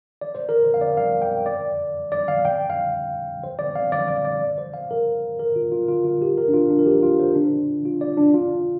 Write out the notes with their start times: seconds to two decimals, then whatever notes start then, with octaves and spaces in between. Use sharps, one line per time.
0.21 D5
0.35 C5
0.49 A#4
0.64 C5
0.74 F5
0.81 D5
0.97 F5
1.22 G5
1.46 D5
2.12 D5
2.28 F5
2.45 G5
2.70 F5
3.43 C5
3.59 D5
3.76 F5
3.92 D5
4.08 D5
4.25 D5
4.58 C5
4.74 F5
4.91 A#4
5.39 A#4
5.56 F4
5.72 F4
5.88 F4
6.04 F4
6.22 G4
6.38 A#4
6.48 D4
6.54 F4
6.70 D4
6.79 A#4
6.86 G4
7.03 F4
7.20 C5
7.35 D4
7.85 F4
8.01 D5
8.17 D4
8.34 F4